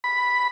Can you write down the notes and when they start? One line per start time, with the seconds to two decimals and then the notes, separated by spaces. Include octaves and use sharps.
0.04 B5